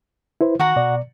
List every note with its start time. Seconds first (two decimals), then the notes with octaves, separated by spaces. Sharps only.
0.41 E4 B4 C5
0.59 D#3 F#4 F#5 A#5
0.76 B2 D5